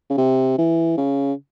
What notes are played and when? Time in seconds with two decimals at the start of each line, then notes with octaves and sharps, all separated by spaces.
0.10 C#3
0.18 C3
0.58 E3
0.97 C#3